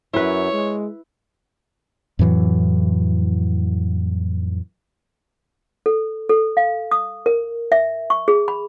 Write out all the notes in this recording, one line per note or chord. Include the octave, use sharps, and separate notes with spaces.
F#2 E4 B4 C#5
G#3
F2 A2 E3 F#3
A4
A4
F5
D#6
A#4
E5
C#6
G#4
B5